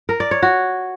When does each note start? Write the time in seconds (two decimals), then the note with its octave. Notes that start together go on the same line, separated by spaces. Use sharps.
0.09 A#4
0.20 D5
0.31 C#5
0.42 F#4